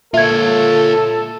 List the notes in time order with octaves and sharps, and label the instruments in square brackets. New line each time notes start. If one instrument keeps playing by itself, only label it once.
[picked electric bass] A#2 [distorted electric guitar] F4 C#5 [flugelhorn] A4 [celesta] E5 G#6